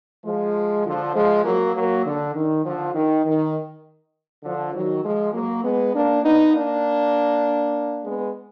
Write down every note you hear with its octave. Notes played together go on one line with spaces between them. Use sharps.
F3 G#3
D3 F3
F3 G#3
F#3 A#3
F#3 A#3
D3
D#3
D3 F3
D#3
D#3
D3 F3
D#3 F#3
F3 G#3
F#3 A#3
G#3 B3
A#3 D4
B3 D#4
A#3 D4
G#3 B3